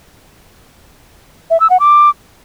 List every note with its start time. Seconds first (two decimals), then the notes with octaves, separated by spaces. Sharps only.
1.50 E5
1.60 E6
1.70 F#5
1.80 D6